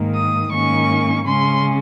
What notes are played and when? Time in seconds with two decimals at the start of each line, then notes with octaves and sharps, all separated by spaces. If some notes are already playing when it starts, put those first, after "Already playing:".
Already playing: G#2 D#3 A#3
0.14 D#6
0.52 G#2 D#3 A#3 C#4 C#6
1.25 C#3 G#3 C#4 C6